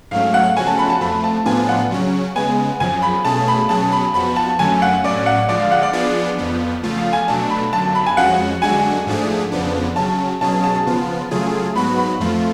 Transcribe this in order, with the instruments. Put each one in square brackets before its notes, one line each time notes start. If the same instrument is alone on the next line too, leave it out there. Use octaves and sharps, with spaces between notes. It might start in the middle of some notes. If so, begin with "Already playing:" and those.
[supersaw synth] G#2 F#3 A3 C#4 [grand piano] F5
[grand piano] F#5
[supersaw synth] C#3 F3 A3 C#4 F#4 [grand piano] G#5
[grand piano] A5
B5
A5
[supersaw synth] F2 F3 A3 [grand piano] B5
[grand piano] A5
[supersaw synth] A2 F3 B3 D4 F4 [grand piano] G#5
[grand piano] F#5
[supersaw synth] C#3 F#3 C#4
[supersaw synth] C#3 G#3 B3 [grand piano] G#5
[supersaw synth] F#2 C#3 F3 [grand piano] G#5
[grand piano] B5
[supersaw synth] B2 A3 C#4 G#4 [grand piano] A5
[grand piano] B5
[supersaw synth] B2 F#3 C#4 G#4 [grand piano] A5
[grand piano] B5
[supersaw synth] F2 F3 B3 F#4 [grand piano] B5
[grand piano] A5
[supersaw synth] F#2 D3 F#3 A3 C#4 [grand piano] G#5
[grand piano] F#5
[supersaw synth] A2 F#3 C#4 [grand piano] D5
[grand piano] F#5
[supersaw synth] D3 F3 G#3 [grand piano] D5
[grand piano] F5
F#5
D5
[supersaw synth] F3 B3 D4 F4 G#4
F2 F3 B3
C#3 F3 A3 F4
[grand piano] F5
G#5
[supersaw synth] B2 F#3 A3 D4 [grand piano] A5
[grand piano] B5
[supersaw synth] F#2 D3 F#3 [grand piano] A5
[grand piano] B5
G#5
[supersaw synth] F2 F3 G#3 C#4 F#4 [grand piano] F#5
[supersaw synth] F#2 D3 G#3 D4 F#4 [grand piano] G#5
[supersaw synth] G#2 F3 A3 D4 G#4
F2 C#3 F3 B3 D4
[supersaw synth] C#3 F#3 C#4 [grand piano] A5
[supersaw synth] B2 F#3 C#4 G#4 [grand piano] A5
[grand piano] A5
[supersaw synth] C#3 F3 B3 F4
C#3 F#3 A3 F4 G#4
[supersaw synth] G#2 F#3 B3 F#4 [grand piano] B5
[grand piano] B5
[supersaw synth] F2 F3 A3 F4